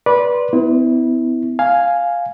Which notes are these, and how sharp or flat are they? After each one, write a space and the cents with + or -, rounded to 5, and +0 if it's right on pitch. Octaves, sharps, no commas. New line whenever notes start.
B4 -20 D5 -15 C6 +0
B3 +40 E4 -25
F5 +0 G#5 +0